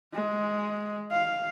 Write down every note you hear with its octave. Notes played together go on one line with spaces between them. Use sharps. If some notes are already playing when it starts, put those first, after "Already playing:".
G#3
F5